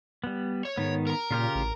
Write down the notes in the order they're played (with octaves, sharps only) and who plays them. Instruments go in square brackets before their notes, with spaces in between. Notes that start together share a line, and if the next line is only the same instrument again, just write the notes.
[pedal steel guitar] G3 B3
[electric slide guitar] C#5
[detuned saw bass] G#2 [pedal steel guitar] D#3 B3
[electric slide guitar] A#4 A#5
[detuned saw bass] A#2 [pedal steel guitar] C#3 F4 G4
[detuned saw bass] A1